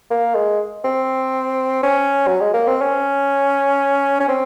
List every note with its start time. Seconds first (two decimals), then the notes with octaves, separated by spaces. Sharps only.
0.11 A#3
0.35 G#3
0.85 C4
1.83 C#4
2.27 F#3
2.41 G#3
2.54 A#3
2.67 C4
2.81 C#4
4.20 C#4
4.29 C4